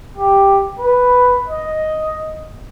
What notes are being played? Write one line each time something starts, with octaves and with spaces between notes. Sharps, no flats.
G4
B4
D#5